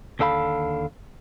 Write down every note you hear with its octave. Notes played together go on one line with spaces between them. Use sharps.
D#2 D3 A4 F5 B5